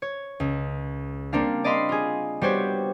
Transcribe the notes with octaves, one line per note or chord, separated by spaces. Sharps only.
C#5
C#2
G3 A#3 C4 D4 F5
D5 D#5 F5 B5 C6
F4 G#4
G3 B3 F#4 G4 C5 C#5